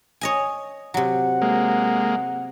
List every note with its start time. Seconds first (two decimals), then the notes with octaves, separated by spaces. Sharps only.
0.21 C#5 D#5 G#5
0.94 C3 F#3 F#5
1.42 G#3 A#3